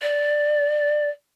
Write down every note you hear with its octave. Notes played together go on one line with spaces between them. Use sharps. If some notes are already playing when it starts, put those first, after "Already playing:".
D5